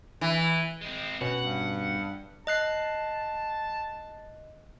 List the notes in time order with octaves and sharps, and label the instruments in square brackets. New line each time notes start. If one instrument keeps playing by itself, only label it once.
[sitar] E3
[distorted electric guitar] G#3 C4
[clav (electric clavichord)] B2 B3 C#4 [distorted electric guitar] F#5
[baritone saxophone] G2
[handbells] D#5 F#6 C7 [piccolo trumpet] A5